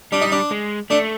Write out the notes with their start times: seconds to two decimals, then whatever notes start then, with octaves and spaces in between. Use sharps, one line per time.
0.12 G3 D4
0.21 D#4
0.32 D4
0.51 G#3
0.90 A3 D4